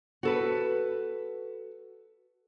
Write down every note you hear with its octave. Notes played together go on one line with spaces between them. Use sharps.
F#4 A4 B4